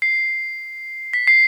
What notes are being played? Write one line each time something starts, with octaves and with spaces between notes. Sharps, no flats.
C7
B6
C7